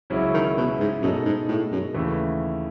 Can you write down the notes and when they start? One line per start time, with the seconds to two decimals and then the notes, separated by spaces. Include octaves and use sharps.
0.10 C#2 C#3 F#3 C#4 E4
0.34 D#3
0.57 B2
0.80 G#2
1.02 F#2 B2 G#3 D#4 A4 D#5
1.25 G#2
1.48 A2
1.72 F#2
1.94 D#2 C#3 E3 A3